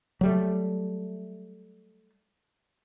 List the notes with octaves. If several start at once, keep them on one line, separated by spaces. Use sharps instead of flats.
F#3 G3 A3